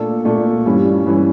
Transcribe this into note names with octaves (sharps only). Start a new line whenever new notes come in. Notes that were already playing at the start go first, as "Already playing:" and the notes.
Already playing: A#2 A3 D4 A4
A#2 A3 D4 A4
G2 E3 G3 C#4
G2 E3 G3 C#4